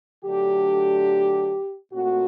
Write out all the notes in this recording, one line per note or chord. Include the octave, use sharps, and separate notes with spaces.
D3 F#3 A3 D4 G4
A#2 A3 C4 F#4